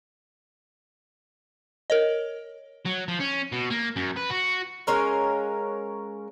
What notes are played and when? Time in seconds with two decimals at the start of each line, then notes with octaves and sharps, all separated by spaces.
1.90 A#4 C#5 D#5
2.86 F#3
3.08 F3
3.20 C#4
3.52 B2
3.71 A#3
3.96 F#2
4.16 B4
4.30 F#4
4.87 G#3 C#4 A#4 F5